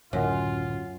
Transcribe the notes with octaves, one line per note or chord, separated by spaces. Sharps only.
C#2 F#2 A2 D3 F4 C#5 F#5 C6